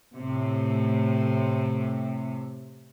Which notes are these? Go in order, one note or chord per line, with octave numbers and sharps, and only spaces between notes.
A2 C3